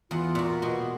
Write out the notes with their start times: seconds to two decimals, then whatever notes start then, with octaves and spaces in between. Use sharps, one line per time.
0.11 E2 F4 F#5
0.35 A#2 F#4
0.62 B2 G#3 F#4